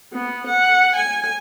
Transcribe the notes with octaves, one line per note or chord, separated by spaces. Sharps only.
B3
F#5
G#5